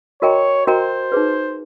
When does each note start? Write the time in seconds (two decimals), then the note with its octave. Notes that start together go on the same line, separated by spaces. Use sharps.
0.22 F#4 A#4 C#5 D#5 G5 A#5
0.67 F#4 A#4 C5 D#5 G5 A#5
1.12 D#4 G#4 B4